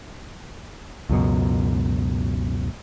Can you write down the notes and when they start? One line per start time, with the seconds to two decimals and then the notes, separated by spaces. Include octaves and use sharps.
1.09 C#2 F#2 B2